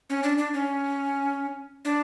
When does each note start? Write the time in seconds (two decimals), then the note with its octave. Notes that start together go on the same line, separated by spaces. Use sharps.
0.10 C#4
0.23 D4
0.38 D4
0.54 C#4
1.85 D4